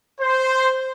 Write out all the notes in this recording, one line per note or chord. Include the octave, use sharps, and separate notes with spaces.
C5